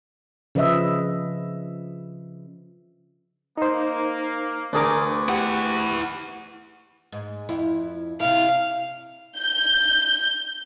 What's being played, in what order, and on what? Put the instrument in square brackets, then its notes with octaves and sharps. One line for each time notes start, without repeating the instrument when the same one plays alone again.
[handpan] C#3 F3 B4 D#5 E5
[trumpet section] A#3 [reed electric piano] D#4 C5
[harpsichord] D2 G#4 D6 [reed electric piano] D4 A#4 [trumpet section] B4 C#6
[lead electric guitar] E4 F#5 [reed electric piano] G4
[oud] G#2
F2 E4
[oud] C3 E4 [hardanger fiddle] F5
[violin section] G6